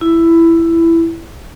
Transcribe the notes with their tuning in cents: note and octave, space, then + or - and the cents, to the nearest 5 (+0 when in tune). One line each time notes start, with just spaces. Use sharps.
E4 +10